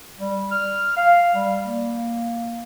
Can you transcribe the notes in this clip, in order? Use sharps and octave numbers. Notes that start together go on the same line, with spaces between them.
G3
F6
F5
G3
A#3